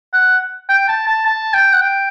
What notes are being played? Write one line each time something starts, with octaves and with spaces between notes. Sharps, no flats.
F#5
G5
A5
A5
A5
G5
F#5
G5